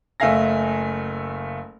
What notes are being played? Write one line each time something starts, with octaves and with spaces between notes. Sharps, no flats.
F#1 A3 E5 F5 G#5 A#6